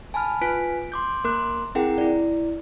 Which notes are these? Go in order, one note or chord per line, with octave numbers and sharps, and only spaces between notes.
G#5 A5 B5 F6
F4 B4 G#5 F#6 B6 D7
C6 D6 G6
A#3 A#4 C6 D6 F#6
C4 E4 G#4 A#4 F#5 G5
E4 D5